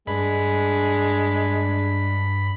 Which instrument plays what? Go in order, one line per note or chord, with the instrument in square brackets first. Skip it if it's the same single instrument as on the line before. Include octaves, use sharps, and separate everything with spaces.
[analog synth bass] G2 [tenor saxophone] G#3 [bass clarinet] D4 [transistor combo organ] B5